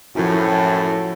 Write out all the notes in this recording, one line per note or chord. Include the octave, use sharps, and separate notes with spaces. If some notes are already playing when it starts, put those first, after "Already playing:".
F#2 A2 F3 E4 F#4